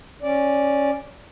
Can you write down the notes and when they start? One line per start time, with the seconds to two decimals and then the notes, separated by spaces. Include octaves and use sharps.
0.22 C#4 D5